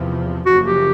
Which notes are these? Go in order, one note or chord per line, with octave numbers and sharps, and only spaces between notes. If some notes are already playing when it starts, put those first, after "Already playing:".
Already playing: E2 C3 F3
F#1 F#2 C#3 F3 A#3 F#4
G4